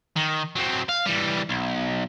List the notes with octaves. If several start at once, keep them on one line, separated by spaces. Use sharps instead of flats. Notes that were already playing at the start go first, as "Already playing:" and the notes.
D#3
F#3 C4
F5
E3 G3
B1